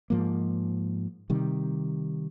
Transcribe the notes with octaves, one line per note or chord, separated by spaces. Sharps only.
G#2 F3 A#3
C3 D#3 G3